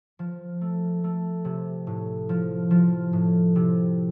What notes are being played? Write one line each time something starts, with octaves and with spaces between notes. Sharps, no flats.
F3
A3
A3
C3
A2
F3
F3
A2
C3